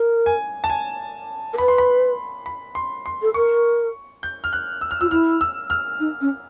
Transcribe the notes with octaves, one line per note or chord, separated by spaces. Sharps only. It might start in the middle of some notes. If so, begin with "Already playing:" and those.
Already playing: A#4
G#5
A5
G#5
A#4
B4 B5
C6
B5
B5
C6
C6
A4
A#4 C#6
G6
F6
F#6
E6
F6
F4 E6
E4 F6
E6
F6
D#4
C#4